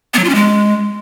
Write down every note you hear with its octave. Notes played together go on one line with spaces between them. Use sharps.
B3
F#3
F4
C#4
G#3